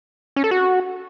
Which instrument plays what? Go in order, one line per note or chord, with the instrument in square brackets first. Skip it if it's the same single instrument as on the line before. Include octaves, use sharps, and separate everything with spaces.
[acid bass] C#4
A4
F#4